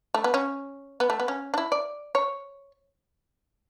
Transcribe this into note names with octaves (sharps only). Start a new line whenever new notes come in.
A3
B3
C#4
B3
A3
B3
C#4
D4
E4
D5
C#5